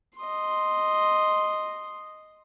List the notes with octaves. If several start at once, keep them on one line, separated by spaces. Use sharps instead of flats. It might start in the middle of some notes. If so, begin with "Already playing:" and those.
D#5 C6